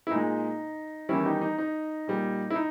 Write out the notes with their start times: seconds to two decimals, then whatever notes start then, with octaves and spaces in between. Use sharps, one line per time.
0.07 E4
0.11 A#2 G#3 D#4
1.09 E2 D#3 G3 C#4 E4
1.25 D#4 G4
1.41 D#4
1.58 D#4
2.07 A#2 G3
2.50 E4
2.56 D#4